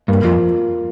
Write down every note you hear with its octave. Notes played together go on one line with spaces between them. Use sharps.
G2 A#3
F2 F4